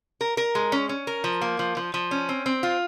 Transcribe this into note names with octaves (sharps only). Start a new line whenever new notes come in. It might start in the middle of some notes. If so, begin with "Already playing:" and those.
A#4
A#4
G#3
C#4
C#4
A#4
F3
A#3
F3
F3
F3
C#4
C4
C4
F4